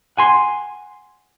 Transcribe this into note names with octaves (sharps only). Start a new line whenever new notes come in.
F#5 G#5 C6